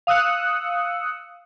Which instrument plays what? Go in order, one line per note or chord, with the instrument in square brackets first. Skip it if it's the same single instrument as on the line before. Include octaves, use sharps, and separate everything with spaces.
[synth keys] F5 D#6 E6 F#6 C#7